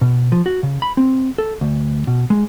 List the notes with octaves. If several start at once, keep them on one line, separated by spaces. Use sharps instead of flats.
B2
F3
F#4
C#3
B5
C4
A4
D2
B2
G#3